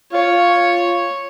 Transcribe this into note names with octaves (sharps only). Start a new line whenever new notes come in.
F4 C#5